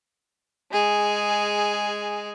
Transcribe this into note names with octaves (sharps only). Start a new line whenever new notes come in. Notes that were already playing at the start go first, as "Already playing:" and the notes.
G#3 G#4